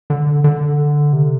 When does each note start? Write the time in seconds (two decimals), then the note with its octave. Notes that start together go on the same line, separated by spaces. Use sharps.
0.10 D3
0.44 D3
1.13 C3